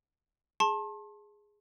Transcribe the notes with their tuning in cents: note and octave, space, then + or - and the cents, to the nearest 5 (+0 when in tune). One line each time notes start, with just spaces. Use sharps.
G#4 +0 A5 +0 C6 +40